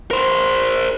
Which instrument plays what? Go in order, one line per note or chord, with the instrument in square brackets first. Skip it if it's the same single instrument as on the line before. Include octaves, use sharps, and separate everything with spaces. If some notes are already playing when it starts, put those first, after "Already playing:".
[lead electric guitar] A#4 C5